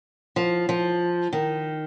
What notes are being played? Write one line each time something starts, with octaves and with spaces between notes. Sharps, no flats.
F3
F3
D#3